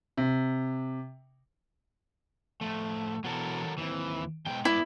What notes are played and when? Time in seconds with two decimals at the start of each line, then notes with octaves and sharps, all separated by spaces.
0.17 C3
2.61 A2 F3 A3
3.24 B2 E3 F#3 A4 A#4
3.78 D#2 E3 C4
4.46 D#2 G#2 B2 G5
4.65 B3 E4 D5